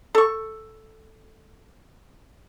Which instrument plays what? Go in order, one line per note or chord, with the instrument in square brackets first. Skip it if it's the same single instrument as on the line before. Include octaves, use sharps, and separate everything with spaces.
[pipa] A4 C#6